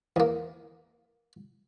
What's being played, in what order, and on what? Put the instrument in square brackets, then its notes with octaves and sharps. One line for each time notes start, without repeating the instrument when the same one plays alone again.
[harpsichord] E2 A#3